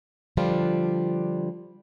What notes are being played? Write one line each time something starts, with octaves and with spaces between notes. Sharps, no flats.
D3 F3 G3 D4 F4